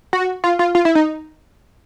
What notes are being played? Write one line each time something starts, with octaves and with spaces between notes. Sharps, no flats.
F#4
F4
F4
F4
E4
D#4